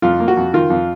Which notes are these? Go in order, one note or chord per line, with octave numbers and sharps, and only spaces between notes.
F2 F4
A#3
F#4
F2
D#3 F4
F2